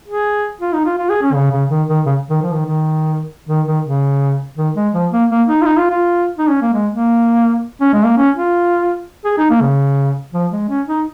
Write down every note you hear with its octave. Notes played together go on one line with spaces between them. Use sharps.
G#4
F4
D#4
F4
F4
G#4
C#4
C#3
C#3
D#3
D#3
C#3
D#3
F3
D#3
D#3
D#3
D#3
C#3
D#3
G#3
F3
A#3
A#3
D#4
F4
D#4
F4
F4
D#4
C#4
A#3
G#3
A#3
C#4
G#3
A#3
C#4
F4
G#4
D#4
A#3
C#3
F3
G#3
C#4
D#4